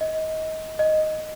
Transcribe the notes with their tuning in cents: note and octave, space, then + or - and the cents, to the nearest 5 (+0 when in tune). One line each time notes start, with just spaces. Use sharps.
D#5 +25
D#5 +0